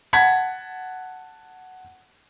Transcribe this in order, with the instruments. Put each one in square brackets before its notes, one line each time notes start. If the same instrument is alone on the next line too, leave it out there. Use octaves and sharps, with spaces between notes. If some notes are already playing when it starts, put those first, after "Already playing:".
[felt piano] F#5 A5 G#6 B6